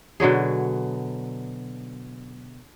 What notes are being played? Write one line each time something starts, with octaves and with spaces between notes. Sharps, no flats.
B2 D3 F#3 G#4